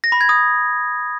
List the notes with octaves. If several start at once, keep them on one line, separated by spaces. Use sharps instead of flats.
A#6
B5
G#6
D#6